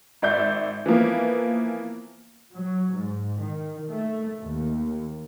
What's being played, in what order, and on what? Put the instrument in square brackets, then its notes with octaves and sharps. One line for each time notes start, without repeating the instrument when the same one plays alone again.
[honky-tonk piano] G#1 D5 E5 G6
E3 F3 A#3 B3
[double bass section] F#3
G#2
D#3
A3
D#2